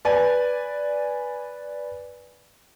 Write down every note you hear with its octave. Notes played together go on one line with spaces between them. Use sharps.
B4 D5 G#5